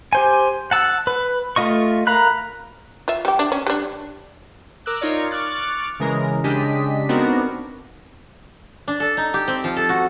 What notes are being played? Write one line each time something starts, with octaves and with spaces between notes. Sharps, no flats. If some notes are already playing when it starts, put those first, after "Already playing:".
G4 C5 G#5
F#5 A5 E6
B4
A3 F4 D#5 C#6
A#4 F5 A#5 B5 F#6
F4 E5
G3 G4
D4
C#4
G3 D4
A#4 D6 E6 F#6
D#4 F4 A#4 C#5 D5
C#6 D6 F6 F#6 A6
C#3 E3 G#3 A#4
C#3 G#3 D4 G4 D#5 B6
B3 C4 D4 D#4 F#4 A#4
D4
A4
D#4
G4
C4
F3
A4
F#4